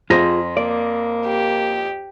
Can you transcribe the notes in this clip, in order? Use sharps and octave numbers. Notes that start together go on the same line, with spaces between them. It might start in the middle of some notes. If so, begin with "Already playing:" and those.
F2 F4 G#4 C5 C6 A#6
A#3 D5
G4